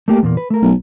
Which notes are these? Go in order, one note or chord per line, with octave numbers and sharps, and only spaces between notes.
A3 A#3 G4
E2 A#2 A#3
B4
A3 A#4
B1